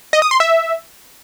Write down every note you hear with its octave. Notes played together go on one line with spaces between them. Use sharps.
D#5
D#6
C6
E5